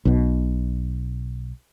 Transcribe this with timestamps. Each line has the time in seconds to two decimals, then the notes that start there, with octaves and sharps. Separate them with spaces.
0.05 B1 B2